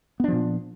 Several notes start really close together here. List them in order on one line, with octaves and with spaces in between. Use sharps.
B3 D4 F3 A#2